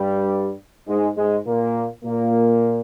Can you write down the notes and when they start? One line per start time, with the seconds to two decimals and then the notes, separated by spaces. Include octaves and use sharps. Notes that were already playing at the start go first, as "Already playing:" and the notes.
Already playing: G2 G3
0.88 G#2 G#3
1.17 G#2 G#3
1.46 A#2 A#3
2.04 A#2 A#3